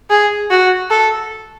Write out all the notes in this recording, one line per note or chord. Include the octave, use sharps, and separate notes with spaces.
G#4
F#4
A4